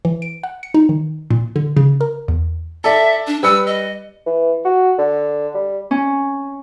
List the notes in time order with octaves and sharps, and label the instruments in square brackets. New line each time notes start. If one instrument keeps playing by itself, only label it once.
[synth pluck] E3
D7
F#5
C#7
D#4
D#3
A#2
D3
C#3
A#4
E2
[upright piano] A4 D5 [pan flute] E5
[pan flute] D4
[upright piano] G3 B4 C#7 [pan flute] E6
[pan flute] D#5
[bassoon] E3
F#4
D3
G3
[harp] C#4